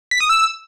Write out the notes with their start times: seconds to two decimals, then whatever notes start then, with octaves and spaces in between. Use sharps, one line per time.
0.11 B6
0.20 D#6
0.30 E6